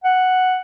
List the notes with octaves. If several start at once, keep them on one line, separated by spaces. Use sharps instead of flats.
F#5